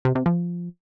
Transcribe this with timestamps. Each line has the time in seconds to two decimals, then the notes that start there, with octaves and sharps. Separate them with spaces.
0.05 C3
0.15 C3
0.26 F3